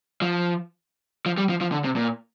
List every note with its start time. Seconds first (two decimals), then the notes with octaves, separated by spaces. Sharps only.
0.22 F3
1.26 F3
1.38 G3
1.49 F3
1.61 F3
1.72 D3
1.84 C3
1.96 A#2